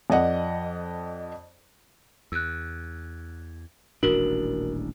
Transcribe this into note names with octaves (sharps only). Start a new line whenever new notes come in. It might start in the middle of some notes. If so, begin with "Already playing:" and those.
F2 D5 D#5 F#5
E2 E6 F#6
D#1 A1 D4 F#4 A#4 F#7